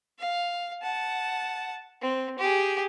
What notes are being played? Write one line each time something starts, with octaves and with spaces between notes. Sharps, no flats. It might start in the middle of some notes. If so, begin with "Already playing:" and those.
F5
F#5 A5
C4
G4 G#4